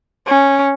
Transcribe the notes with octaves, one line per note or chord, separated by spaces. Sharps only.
C#4